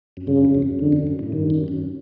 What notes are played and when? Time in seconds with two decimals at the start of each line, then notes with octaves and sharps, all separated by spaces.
0.17 F#2
0.27 G2 C#3
0.45 F#2
0.54 F2
0.62 F#2
0.79 F2 D3
0.92 F#2
1.07 F#2
1.19 A2
1.32 G2 D#3
1.50 F#2
1.68 F#2